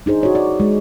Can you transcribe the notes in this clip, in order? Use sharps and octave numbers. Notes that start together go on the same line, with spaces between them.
D4 D#4 G#4 C5
F#4 C#5
D5
G#3